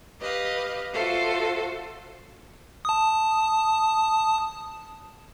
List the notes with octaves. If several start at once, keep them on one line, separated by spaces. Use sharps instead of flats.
G4 B4 D#5 F5
F4 F#4 A4 C5 E5
A5 D#6